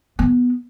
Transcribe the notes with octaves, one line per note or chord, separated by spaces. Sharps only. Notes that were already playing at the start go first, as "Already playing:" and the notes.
B3